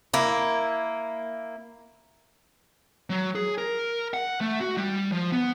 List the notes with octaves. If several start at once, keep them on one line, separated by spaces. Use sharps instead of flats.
A#3 E4
F#3
G#4
A#4
F#5
A3
F#4
G3
F3
B3